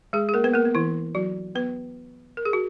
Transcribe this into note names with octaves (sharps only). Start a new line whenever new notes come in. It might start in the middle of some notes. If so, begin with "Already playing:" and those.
G#3 G#4
G#4
A#3 A#4
B3 B4
A#3 A#4
B3
E3 E4
F#3 F#4
B3 B4
A#4
G#4
F#4